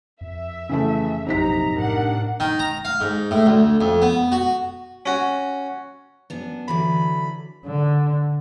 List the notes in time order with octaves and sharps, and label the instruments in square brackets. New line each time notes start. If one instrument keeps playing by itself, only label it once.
[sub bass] F2 [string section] E5
[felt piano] C#3 E3 A3
[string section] A#1 F#2 A#5 [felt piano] C3 D#4 B6
[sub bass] A2 [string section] D4 A#4 F#5
[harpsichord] D#3
A#5
F5
G#2
A2
D2
F2
B3
F#4
C#4 F#4
[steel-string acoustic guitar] F#2 B3 D4
[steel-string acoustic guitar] D3 E3 F#3 [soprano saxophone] B5
[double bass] D3